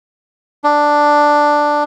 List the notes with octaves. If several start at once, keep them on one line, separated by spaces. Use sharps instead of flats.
D4